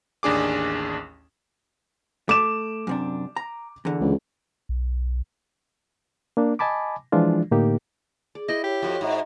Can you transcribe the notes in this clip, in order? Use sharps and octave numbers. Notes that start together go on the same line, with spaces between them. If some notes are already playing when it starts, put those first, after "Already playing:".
A1 D#2 D4 G#4 D6
A3 D6 E7
F#2 C3 D4
A#5
E2 D3
C#2
B1
A#3 D4
D#5 G#5 A5 B5 D6
E3 F3 G#3 D4 F4
A2 D3 A#3 D#4 G4
G#4 D5
E4 D#5 G5 B5
G4 C#5
F2 F4 F#4 F#5
G#2 D#5 E5 A#5